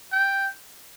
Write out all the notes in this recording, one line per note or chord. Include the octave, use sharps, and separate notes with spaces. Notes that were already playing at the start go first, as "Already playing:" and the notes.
G5